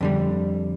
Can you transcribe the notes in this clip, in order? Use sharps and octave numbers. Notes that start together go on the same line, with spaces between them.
F2 D3 G3